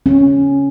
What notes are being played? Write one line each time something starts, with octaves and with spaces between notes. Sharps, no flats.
C#4